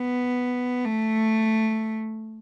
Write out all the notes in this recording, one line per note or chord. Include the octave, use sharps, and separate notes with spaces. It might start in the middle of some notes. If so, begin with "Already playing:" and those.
Already playing: B3
A3